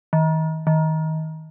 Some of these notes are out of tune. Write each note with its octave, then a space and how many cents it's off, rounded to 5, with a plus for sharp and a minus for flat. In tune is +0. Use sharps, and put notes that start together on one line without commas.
D#3 +35
D#3 +25